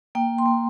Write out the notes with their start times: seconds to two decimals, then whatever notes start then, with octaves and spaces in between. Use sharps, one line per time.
0.15 A#3 G5
0.38 C6
0.46 A#3